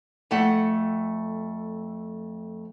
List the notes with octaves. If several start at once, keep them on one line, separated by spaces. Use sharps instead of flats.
F2 A3 F#5